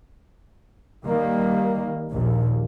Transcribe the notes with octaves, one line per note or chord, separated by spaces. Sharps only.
D#3 G3 A#3
A#1 D#2 A#2